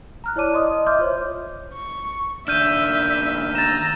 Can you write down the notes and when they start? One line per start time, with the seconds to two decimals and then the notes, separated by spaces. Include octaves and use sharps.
0.24 A#5 F6 F#6
0.36 E4 C#5 D5 A5 D6 D#7
0.53 D#5 C6 D6 D#6
0.72 D#5
0.86 D#5 E5 C6 D6 F6 G6
0.99 F4 C5 C#5
1.73 C#6
2.48 D#2 D4 E5 F6 G6 D#7
3.55 A#5 E6 A6 E7